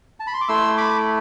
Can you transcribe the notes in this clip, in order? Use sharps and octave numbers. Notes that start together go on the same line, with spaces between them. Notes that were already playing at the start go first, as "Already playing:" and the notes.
A5
B5
C6
D6
A3 E4 C6 E6
B5 D6